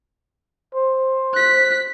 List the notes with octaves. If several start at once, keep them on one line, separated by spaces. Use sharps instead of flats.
C5
F#6 B6